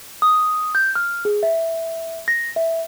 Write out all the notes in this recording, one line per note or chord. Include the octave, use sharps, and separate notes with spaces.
D#6
G6
F6
G#4
E5
A#6
E5